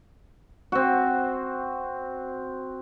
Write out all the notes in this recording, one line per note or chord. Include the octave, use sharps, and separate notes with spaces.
C4 F#4